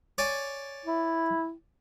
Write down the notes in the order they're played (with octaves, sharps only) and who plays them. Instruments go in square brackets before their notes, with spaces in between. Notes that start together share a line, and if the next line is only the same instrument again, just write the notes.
[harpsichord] C#5 D5 G#5
[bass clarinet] E4